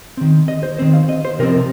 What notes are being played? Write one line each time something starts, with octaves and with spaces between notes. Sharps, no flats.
D#3 C4
D#5
C5
D#3 C4 C5
F5
D#5
C5
C3 F3 C4 A#4